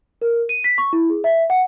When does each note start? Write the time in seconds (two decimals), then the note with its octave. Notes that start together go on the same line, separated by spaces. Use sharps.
0.22 A#4
0.49 D#7
0.64 B6
0.78 C#6
0.93 E4
1.10 G#4
1.24 E5
1.50 F#5